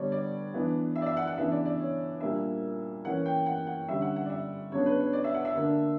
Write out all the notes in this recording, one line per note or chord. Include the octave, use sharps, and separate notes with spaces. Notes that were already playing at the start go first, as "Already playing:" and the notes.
Already playing: D3 G3 B3 D4 C#5 D5
D5
E3 B3 D4
E5
D5
E5
F#5
F#5
C#3 E3 B3 D4 E5
D5
D5
C#5
A#2 G3 A#3 D4 E5
E3 A#3 C#4 F#5
G5
F#5
F#5
D3 G3 C#4 E5
F#5
F#5
D5
E5
C#3 F#3 B3 D4 C#5
B4
C#5
D5
E5
F#5
E5
D3 A#3 D4